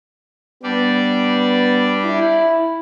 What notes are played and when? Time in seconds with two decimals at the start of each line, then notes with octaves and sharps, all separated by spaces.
0.63 G3 B3 D4 D5
2.05 E4